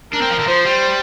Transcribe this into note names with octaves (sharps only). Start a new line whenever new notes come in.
D4 A#4
C4
F3
D3
F3 C5
G3